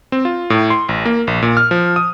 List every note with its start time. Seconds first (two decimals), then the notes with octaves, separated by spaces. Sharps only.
0.12 C4
0.25 F4
0.50 A2
0.70 C6
0.89 A1
1.06 A#3
1.27 A#1
1.42 A#2
1.57 F6
1.71 F3
1.96 D#6